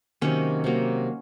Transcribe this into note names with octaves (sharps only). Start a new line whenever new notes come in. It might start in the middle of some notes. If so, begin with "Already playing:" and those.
C3 D#3 F#3 A#3 C#4
C3 D#3 F#3 A#3